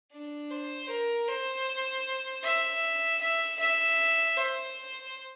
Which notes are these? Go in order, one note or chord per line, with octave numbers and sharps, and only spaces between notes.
D4
C5
A#4
C5
E5
E5
E5
C5